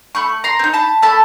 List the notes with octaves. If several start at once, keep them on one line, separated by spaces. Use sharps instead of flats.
A3 B5 C#6
A#5 C6
C4
D#4
A5 B5
A3 A5 B5